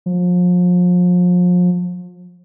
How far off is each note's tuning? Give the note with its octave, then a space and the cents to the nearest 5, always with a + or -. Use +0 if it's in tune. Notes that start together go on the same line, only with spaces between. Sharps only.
F3 +35